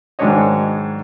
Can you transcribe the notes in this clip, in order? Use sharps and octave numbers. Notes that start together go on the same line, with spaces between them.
G#2 D#3 F#3 D4 C#5 D#5